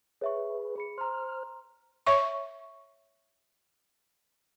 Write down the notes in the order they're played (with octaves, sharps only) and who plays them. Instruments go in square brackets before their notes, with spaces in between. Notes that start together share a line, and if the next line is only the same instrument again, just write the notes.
[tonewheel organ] G#4 B4 [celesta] C#5 E5 C#6
[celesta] G#4 B5 C#7
[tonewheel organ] C5 F6 [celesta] A#5 C6
[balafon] C#5 E5 C#6